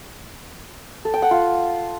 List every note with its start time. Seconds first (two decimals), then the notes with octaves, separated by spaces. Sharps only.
1.05 A4
1.14 G5
1.22 F#5
1.31 F4